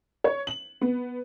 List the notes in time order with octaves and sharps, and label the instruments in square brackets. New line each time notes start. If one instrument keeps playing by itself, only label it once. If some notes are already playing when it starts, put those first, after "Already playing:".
[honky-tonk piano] C#5
F#7
B3